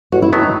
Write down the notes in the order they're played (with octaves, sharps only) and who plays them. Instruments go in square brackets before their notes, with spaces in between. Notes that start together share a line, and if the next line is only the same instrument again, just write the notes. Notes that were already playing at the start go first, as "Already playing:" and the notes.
[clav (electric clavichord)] A1 [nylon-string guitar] F#4
[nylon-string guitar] E4
[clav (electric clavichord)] A2 F#3 B3 [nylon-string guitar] E4
[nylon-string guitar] D#4